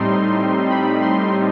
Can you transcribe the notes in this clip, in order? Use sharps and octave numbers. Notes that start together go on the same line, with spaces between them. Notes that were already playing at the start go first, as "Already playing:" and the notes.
Already playing: A2 G3 C4 D#4 C6
B5
C6